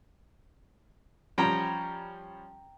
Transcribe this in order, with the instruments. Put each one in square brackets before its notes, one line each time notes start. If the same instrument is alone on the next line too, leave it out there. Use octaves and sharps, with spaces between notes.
[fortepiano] F3 G3 C#4 [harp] G5 A#5